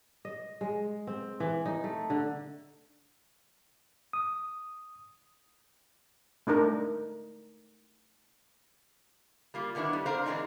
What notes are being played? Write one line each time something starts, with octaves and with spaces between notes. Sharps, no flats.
D#5
G#3
C4
E3
D#4
A3
D3
D#6
A3 D4 D#4 A#4
G3 A#3 F4
D3 D#3 B3 D4 E4
G3
C4 D4 A#4 C5 F5
E3 G#3 A#3 C4 D4 D#4